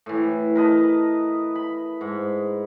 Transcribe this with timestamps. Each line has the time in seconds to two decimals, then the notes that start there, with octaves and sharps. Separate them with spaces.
0.06 A2 E3
0.55 A#4 B4 D#5 A5
1.55 B5
2.01 G#2